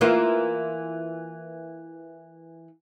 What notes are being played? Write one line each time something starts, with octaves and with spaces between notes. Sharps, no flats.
E3 A#3 F4